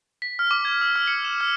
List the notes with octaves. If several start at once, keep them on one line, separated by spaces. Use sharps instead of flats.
B6
F6
D6
G#6
E6
F6
C#7
E7
F6